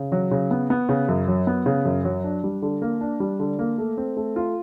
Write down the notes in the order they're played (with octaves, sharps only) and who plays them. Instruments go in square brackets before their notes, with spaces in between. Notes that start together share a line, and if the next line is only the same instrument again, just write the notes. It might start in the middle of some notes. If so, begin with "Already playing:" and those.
Already playing: [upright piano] C#3
F#3
C#3
B3
B3
C#3
F#2
F#3
B3
C#3
F#2
F#3
D4
G3
D3
A#3
D4
G3
D3
A#3
A3
C4
A3
F4